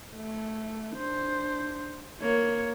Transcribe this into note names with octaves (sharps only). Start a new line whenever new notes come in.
A3
D4 C5
A#3 C#5